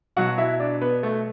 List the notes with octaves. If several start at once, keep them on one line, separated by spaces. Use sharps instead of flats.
B2 F#3 F#4 F#5
E4 E5
D4 D5
B3 B4
A3